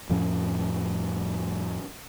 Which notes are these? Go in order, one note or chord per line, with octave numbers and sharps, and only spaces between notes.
F2 A2 F3 C#4